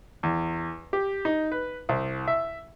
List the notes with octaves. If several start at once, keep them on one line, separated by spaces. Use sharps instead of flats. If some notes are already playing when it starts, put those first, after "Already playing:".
E2
G4
D#4
B4
C2
E5